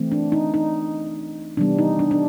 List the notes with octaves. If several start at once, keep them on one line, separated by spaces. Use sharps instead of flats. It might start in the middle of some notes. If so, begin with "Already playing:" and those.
Already playing: E3 A3 C4
D4
D#4
D#4
C3 E3 G3 B3 D4
D#4
D4
D4